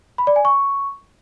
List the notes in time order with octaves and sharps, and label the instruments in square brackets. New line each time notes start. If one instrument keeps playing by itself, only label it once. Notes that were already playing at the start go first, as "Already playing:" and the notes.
[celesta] B5
D5
G#5
C#6